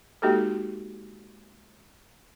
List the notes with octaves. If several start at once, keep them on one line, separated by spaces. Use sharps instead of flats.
G#3 A#3 D#4 F#4 G4 A4